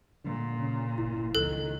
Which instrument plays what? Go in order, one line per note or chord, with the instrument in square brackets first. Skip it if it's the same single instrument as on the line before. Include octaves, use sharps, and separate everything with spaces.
[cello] A#2 [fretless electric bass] D3
[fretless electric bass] C#3
[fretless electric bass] G1 [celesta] E4
[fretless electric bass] C#2 [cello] D#3 [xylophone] A4 [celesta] F#6